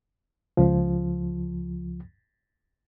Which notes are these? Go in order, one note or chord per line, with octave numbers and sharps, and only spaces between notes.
C#2 F3